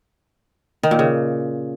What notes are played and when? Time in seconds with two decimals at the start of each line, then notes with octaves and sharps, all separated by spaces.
0.83 D#3
0.91 A#2
0.99 C#3